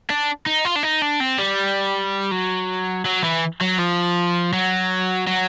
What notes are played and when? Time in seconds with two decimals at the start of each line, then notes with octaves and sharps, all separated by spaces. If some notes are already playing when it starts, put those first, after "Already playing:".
0.10 D4
0.46 D#4
0.65 F4
0.76 D4
0.83 D#4
1.02 D4
1.20 C4
1.39 G3
2.31 F#3
3.06 F#3
3.24 E3
3.61 F#3
3.79 F3
4.53 F#3
5.27 F#3